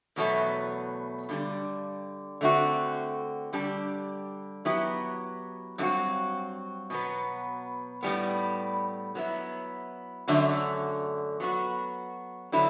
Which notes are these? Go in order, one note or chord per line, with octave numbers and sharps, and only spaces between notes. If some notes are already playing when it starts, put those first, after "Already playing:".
E2 B2 F#3 A3
G2 D3 G3
D3 A3 C4 F#4
D3 G3 D4 G4
F#3 B3 E4 G4
G2 F#3 A3 C4 F#4
B2 F#3 B3
A2 G3 B3
F#3 B3 E4
F#2 D3 F#3 A3
F#3 B3 F#4
D3 F#3 B3 E4